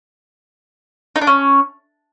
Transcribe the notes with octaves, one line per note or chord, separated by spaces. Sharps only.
D#4
D4
C#4